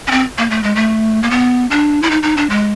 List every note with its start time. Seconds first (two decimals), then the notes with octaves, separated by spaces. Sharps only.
0.07 C#4
0.11 C4
0.38 A#3
0.50 A3
0.63 G#3
0.75 A3
1.23 A#3
1.30 B3
1.70 D4
2.02 E4
2.10 D#4
2.23 D#4
2.37 D4
2.50 G#3